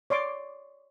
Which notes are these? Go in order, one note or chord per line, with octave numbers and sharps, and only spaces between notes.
C#5 D5 C6 D6